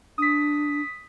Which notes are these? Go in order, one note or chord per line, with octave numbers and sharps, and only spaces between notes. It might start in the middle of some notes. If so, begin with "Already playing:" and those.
D4 D#6 B6